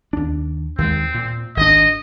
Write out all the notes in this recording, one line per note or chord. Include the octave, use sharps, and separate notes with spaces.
D#2 D4
D#2 G#3 C4
A#2
G#1 D4 D#5